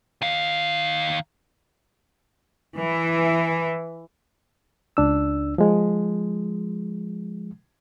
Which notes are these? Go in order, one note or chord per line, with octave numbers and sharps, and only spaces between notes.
D#3 F5
E3
C#2 D4 E6
F3 G#3